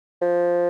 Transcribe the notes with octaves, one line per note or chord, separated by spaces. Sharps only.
F3